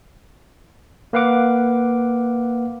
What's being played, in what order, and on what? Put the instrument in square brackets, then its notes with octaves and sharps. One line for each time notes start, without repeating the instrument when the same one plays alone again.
[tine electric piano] A#3 B4 F5 F#5 D6